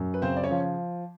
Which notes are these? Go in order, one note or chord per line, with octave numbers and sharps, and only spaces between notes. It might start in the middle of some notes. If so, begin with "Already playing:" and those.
Already playing: F#2
B4
C#3 C4 C5
D5
C#4 C#5
F3